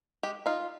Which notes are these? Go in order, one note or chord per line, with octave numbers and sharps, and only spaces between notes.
G#3 G4
D#4 F4